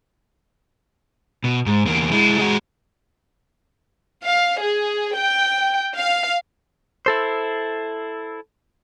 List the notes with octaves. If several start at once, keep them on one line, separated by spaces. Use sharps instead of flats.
B2
G#2
E2 A#3
G#3 E4
G#3 F#4
F5
G#4
G5
F5
E4 A4 C5